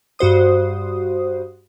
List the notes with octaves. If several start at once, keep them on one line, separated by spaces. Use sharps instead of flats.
G2 F#4 C5 D#6